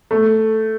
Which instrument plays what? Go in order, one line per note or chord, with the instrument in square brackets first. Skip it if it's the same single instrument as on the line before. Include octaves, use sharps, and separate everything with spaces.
[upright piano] A3